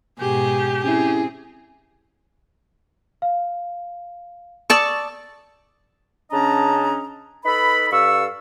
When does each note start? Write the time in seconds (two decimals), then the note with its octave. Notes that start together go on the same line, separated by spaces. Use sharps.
0.20 G#2 B2 G4 G#4
0.84 C4 C#4 E4 G#4
3.22 F5
4.70 D5 A5 C#6 D#6 E6
6.31 C#3 C#4 D4 D#5 A5 A#5
7.45 D#4 A4 B4 B5
7.92 G2 A4 F5 C#6 E6